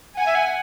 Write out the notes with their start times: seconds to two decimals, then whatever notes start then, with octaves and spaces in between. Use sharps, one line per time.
0.17 F#5 G#5
0.26 E5
0.35 F#5